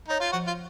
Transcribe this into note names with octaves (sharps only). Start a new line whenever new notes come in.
D#4 C#5
F4
F3 F#4
F4